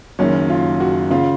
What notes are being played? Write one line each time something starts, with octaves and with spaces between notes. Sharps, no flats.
F#1 F#2 D#3 C#4
F4
F#4
C#3 F4